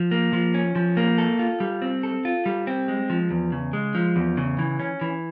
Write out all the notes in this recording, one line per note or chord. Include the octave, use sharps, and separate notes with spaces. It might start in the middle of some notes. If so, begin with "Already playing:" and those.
Already playing: F3
A#3
F3
C#4
F3
A#3
A4
F4
G3
C4
A4
F4
G3
C4
G#3
F3
E2
C#3
G#3
F3
E2
C#3
E3
C#4
E3